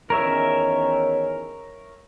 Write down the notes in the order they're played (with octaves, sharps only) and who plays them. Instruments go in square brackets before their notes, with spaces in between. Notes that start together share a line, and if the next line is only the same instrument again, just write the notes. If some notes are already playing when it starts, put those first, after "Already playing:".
[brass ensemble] E2 D#3 C#4 [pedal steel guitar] A#4 C#5 E5